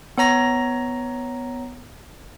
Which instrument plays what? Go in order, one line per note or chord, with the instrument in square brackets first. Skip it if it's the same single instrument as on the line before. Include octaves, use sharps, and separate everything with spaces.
[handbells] B3 C#5 A#5 A#6